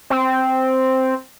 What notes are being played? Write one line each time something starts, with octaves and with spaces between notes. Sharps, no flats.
C4